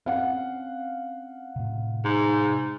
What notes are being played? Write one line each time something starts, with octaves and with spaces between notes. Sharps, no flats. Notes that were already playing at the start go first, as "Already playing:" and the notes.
C4 C#4 F5 F#5
A2 C3
G#2